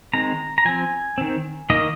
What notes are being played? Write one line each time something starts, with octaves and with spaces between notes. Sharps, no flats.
D#3 G#3 C4 A#5
A#5
F3 C4 G#5
D#3 C4
D#3 A#3 D#5